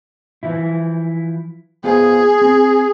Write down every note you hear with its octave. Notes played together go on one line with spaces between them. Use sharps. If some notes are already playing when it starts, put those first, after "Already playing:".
E3 F3 E4
B3 F4 G#4 C5
C4